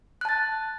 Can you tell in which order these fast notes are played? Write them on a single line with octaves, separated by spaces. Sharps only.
F#6 A5 A6